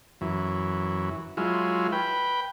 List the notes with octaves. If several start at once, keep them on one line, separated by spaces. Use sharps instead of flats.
F#2 E3
F#3 G#3 E4 F4
B4 G5